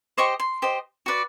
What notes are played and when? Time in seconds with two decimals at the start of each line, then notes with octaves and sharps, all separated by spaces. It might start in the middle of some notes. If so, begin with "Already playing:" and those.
0.17 G4 C5 D#5 C#6
0.40 C6
0.62 G4 C5 D#5
1.06 F#4 B4 D5